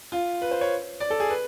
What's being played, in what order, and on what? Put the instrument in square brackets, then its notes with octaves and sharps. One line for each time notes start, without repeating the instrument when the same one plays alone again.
[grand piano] F4
B4
C5
C#5
D5
A4
G#4
B4